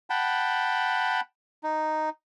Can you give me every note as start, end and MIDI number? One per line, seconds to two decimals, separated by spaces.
0.10 1.21 78
0.10 1.21 79
0.10 1.21 81
0.10 1.21 83
1.63 2.09 63